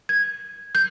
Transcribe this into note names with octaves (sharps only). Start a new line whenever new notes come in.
G#6
G6